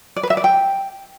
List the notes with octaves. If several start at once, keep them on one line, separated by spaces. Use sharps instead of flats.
D5
B4
E5
D5
G5